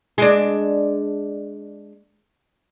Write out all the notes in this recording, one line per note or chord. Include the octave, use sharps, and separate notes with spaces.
G#3 D4